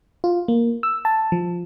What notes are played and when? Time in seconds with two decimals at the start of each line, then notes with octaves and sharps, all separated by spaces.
0.24 F4
0.48 A#3
0.83 E6
1.05 A5
1.32 F3